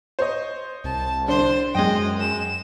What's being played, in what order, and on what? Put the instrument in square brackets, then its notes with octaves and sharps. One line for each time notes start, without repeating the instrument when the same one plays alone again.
[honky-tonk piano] C5 C#5 D#5
[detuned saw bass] C2 [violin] A5
[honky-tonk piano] D3 D4 [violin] C5
[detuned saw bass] F#2 [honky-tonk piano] G#3 G5 [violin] D#5
[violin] E7